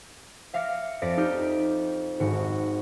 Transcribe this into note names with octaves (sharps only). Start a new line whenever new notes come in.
E5 F5 D6 F6 A#6 C#7
F2 D5 A#6 B6 D7
D#4 G4 F6
G#1 G#2 F#4